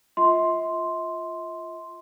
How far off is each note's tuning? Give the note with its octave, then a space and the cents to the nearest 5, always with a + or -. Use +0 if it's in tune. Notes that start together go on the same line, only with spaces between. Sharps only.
F4 +0 E5 -45 C6 +0